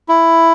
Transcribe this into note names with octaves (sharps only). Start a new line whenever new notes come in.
E4